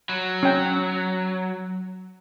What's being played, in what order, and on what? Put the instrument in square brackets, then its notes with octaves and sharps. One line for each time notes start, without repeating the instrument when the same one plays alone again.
[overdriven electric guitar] F#3
[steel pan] C#4 G5